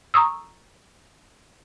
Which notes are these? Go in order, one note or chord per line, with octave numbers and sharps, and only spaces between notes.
A#5 C#6 D#6 E6